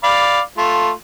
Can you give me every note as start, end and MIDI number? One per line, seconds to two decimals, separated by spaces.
0.03 0.40 74
0.03 0.40 77
0.03 0.40 83
0.57 0.90 57
0.57 0.90 65